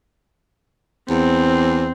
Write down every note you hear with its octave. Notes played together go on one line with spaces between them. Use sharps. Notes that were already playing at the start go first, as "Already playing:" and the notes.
E2 C4